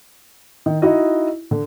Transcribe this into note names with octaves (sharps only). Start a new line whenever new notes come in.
D#3
D#4 E4 F#4 D#5
D3